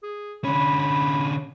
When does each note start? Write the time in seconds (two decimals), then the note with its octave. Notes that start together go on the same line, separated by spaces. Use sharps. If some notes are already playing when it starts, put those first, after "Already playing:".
0.03 G#4
0.44 D3 C#4 B5
0.79 B5